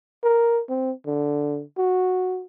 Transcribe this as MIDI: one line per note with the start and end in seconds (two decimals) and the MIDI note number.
0.24 0.62 70
0.69 0.92 60
1.07 1.62 50
1.78 2.45 66